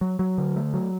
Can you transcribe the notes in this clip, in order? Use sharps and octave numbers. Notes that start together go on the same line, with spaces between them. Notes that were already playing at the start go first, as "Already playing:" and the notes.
F#3
F#3
D3
A3
F#3